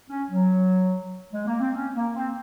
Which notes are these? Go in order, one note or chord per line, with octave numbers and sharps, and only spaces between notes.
C#4
F#3
G#3
A#3
C4
C#4
A#3
C4